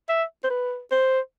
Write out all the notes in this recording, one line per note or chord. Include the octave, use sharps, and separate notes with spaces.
E5
C5
B4
C5